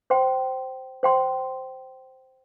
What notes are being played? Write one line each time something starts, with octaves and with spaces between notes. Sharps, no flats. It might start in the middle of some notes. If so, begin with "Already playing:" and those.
C5 G5 C6
C5 G5 C6